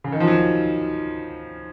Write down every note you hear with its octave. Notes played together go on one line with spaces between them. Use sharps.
C#3
D#3
F3
F#3